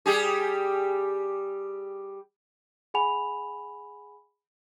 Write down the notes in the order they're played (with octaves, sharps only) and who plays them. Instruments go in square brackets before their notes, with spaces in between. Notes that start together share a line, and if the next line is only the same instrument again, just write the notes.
[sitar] G3 G4 G#4
[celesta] G#4 F#5 G#5 B5 F7